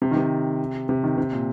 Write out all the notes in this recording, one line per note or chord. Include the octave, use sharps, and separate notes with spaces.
C3
D#3
C3
C3
D#3
C3
A#2